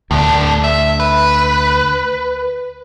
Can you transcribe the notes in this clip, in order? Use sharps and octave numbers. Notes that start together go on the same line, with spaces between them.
D2 A2 D4
E5
B4